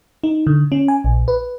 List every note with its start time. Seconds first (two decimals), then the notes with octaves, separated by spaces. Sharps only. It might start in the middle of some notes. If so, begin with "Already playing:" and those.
0.24 D#4
0.47 D3
0.72 C#4
0.88 G#5
1.04 A#1
1.28 B4